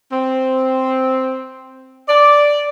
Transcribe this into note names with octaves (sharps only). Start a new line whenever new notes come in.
C4
D5